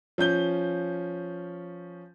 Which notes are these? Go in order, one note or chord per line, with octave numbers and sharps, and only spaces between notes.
F3 C#4 G6 G7